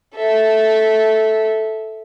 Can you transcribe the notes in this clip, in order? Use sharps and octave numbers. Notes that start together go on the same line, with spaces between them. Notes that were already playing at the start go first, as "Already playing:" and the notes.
A4 E5